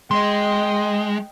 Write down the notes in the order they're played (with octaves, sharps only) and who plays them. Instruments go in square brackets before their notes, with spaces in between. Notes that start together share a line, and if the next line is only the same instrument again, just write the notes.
[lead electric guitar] G#3 [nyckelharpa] D#5 G5 [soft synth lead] C6